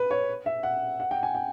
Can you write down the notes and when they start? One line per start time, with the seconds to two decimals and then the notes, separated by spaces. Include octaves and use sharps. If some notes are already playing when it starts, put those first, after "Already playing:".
Already playing: B4
0.11 C#5
0.46 E5
0.63 F#5
1.00 F#5
1.11 G5
1.23 G#5
1.35 G5